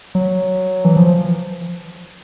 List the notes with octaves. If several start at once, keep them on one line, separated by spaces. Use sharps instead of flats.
F#3
E3
F3